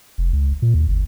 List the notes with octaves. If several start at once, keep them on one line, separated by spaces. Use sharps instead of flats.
F1
C#2
A#2
D#2
G1